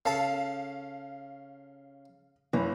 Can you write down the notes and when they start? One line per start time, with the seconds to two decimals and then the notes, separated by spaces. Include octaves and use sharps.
0.05 C#3 A4 F5 A5
2.53 F#1 E3